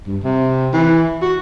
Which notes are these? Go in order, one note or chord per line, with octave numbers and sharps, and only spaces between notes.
G2
C3
E3
F#4